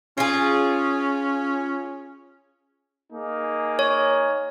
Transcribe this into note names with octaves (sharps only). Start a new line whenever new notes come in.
C#4 F4 G#4
A#3 D#4 G#4
C#5